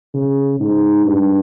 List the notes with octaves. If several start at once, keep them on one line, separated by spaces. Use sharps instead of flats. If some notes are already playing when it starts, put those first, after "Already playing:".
C#3
G#2
G2